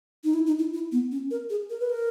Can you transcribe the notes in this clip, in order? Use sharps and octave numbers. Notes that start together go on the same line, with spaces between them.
D#4
E4
D#4
E4
E4
B3
C#4
A#4
G#4
A#4
B4
A#4